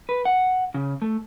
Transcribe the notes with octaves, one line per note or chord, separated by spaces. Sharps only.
B4
F#5
C#3
A3